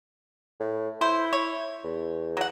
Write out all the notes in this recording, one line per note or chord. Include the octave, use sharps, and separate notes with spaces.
A2
E4 C5
C#5
E2
F#3 F#5